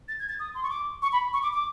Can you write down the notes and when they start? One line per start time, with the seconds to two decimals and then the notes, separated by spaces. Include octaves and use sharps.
0.08 A6
0.19 G#6
0.29 A6
0.39 D#6
0.55 C6
0.63 C#6
0.70 D6
1.02 C#6
1.12 B5
1.33 C#6
1.43 D6
1.53 D6